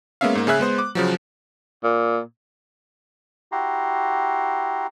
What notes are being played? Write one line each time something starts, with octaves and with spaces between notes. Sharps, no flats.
G#3 A#3 B3 C#4 E5 F5
G#2 A#3
C#3 G#4 E5 F#6
G#3 B3 C5
D6
C#3 F3 F#3
A#2
E4 F#4 G4 A#5 C6